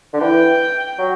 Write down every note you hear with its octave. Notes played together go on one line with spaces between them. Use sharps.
D3
E3 G5
F#3